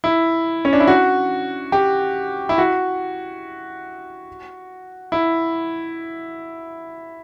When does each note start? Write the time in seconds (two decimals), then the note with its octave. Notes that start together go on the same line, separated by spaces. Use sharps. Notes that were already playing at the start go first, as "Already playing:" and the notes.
0.04 E4
0.65 C#4
0.73 D4
0.80 E4
0.87 F#4
1.72 G4
2.49 E4
2.58 F#4
5.12 E4